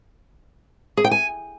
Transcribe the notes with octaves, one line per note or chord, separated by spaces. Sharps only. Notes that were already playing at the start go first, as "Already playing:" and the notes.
G#4
G5
G#5